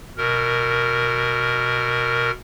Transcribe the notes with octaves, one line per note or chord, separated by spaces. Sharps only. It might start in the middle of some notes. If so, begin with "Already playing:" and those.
B2 A#4